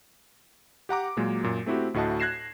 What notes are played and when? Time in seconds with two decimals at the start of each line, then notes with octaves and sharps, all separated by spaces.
0.89 G4 F#5 A#5 D6
1.17 A#2 F#3 G#3 A#3
1.44 F#2 A#2
1.66 A3 C4 E4 F#4 G4
1.94 D2 A2 F#4 D#5 A5
2.20 F#6 G#6 A#6 C7 E7